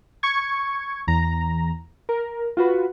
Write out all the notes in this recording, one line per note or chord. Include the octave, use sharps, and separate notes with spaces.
C#6 G#6
E2 A#5
A#4
F4 F#4 B4